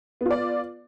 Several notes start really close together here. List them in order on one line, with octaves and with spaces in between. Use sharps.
B3 F4 D5